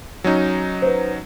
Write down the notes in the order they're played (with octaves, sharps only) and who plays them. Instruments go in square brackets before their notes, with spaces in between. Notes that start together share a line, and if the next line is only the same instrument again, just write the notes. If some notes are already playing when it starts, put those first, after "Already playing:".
[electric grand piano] F#3 C#4 D#4
[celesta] B4 C5